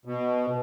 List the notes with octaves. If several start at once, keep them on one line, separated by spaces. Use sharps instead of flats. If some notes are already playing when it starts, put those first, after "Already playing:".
B2